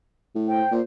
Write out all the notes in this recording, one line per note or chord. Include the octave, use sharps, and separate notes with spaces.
A2
C5 G5
A#2 C5